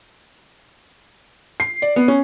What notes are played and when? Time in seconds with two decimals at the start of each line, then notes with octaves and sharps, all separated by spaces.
1.60 C7
1.82 D5
1.96 B3
2.08 C#4